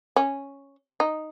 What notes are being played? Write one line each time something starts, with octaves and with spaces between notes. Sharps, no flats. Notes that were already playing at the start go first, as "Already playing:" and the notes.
C#4
D#4